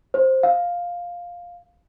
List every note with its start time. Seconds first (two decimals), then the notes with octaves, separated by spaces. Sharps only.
0.14 C5
0.43 F5